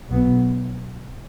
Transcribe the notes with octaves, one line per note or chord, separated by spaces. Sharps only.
B1 B2 F#3 B3